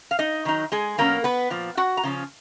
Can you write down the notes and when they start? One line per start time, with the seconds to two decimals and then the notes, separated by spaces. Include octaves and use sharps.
0.11 F5
0.19 D#4 D#5
0.45 D#3 F#3 D#4
0.72 G#3 G#4
0.98 B2 F#3 A#3 C#4 A#4
1.24 B3 B4
1.50 A#2 F3
1.77 F#4 F#5
1.97 A#5
2.03 C#3 F3 C#4